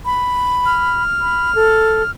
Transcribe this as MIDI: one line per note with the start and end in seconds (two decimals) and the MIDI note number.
0.05 1.03 83
0.66 2.11 89
1.21 1.53 83
1.55 2.03 69